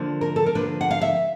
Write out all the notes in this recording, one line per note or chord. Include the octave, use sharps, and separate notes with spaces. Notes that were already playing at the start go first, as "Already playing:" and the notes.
Already playing: D3 F3 A#3 D4
A#4
A4
A#4
D3 F3 A#3 D4 B4
F#5
F5
E5